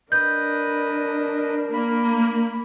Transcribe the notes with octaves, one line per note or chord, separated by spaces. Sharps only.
D4 A#4 B4 D#5 G6
A#3 B5